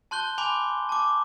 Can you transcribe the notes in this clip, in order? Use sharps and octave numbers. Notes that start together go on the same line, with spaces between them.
A5 C6 F#6 G6 G7
G#5 B5 C6 D6
A5 D6